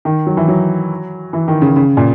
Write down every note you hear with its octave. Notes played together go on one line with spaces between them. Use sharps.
D#3
F#3
E3
F#3
E3
D#3
C#3
C#3
A#2